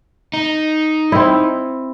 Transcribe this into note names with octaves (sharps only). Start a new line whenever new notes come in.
D#4
C4 E4